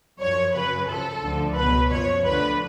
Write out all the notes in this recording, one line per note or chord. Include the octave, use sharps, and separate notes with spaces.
F#2 F3 C#5
F#2 C#3 F#3 B4
F#2 F3 A4
D2 D3 F3
C#2 B2 F#3 B4
F#2 F3 C#5
D2 D3 F3 B4